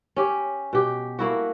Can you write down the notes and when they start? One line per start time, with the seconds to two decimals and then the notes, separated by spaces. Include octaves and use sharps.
0.16 C#4 G4
0.73 B2 G4
1.19 A3 A#3 E4 F#4